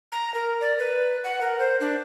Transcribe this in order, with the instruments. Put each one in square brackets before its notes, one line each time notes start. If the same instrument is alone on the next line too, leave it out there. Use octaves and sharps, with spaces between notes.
[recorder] A#5
A#4
D5
B4
F#5
A#4
C5
D4